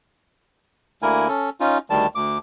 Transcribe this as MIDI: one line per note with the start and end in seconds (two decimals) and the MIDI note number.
1.02 1.28 38
1.02 1.28 50
1.02 1.28 58
1.02 1.28 64
1.02 1.28 70
1.02 1.28 80
1.28 1.50 61
1.28 1.50 69
1.60 1.78 61
1.60 1.78 63
1.60 1.78 65
1.90 2.07 38
1.90 2.07 51
1.90 2.07 55
1.90 2.07 81
2.15 2.38 38
2.15 2.38 86